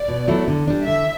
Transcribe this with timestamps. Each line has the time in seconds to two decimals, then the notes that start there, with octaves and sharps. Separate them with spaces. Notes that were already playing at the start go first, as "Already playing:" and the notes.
Already playing: D5
0.08 B2
0.28 F#3 A3 E4
0.48 D3
0.68 G3 D4
0.87 D3 E5